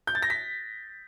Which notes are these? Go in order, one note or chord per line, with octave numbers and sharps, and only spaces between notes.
G6
A6
A#6
B6